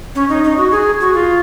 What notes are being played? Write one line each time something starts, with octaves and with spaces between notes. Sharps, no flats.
C#4
D#4
D#4
F#4
G#4
F#4
F4